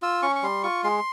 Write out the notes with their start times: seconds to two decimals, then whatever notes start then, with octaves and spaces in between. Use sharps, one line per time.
0.02 F4 E6
0.22 C#4 C#6
0.36 C#6
0.43 G3 C6
0.63 F4 C#6
0.84 G#3 C6